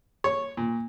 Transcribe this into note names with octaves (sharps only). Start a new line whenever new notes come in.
C#5
A#2